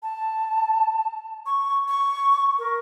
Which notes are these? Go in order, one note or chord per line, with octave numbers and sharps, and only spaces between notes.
A5
C#6
C#6
A#4